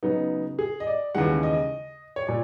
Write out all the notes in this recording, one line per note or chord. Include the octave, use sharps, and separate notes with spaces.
C#3 F#3 B3 D#4
G#4
D#5
D5
D#2 C#3 E3 G#3 F#5
D#5
C#5
A#2 D5